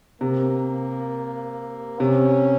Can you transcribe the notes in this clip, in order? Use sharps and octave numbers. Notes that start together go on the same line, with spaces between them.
C3 A#3
C3 C#4